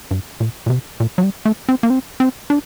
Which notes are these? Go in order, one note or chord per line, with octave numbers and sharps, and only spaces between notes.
G2
A#2
A#2
C3
A#2
F#3
G3
A3
C4
A#3
C4
C4
D4